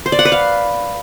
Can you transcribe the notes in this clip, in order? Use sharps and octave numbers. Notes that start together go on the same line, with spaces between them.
C5
D5
F#5
B4
F5